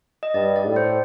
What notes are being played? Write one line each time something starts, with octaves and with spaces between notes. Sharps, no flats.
D#5
G2 D5
D5
A2
C5